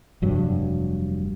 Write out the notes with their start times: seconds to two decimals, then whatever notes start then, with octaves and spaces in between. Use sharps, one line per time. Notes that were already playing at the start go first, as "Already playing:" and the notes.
0.22 F1 G2 F#3